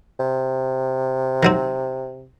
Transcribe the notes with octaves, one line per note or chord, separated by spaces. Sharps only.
C3
D#3 F#3 C4